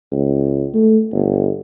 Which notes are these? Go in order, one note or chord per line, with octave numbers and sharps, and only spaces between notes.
C#2
A3
G1